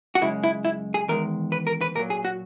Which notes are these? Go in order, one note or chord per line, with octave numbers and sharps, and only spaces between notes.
F#4
F#2 C#3 G#3 E4
E4
E4
G#4
E2 D#3 G#3 A#4
B4
A#4
B4
A#2 F#3 A#4
G#4
F#4